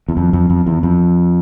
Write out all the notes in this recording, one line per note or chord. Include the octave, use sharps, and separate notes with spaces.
E2
F2
F2
F2
E2
F2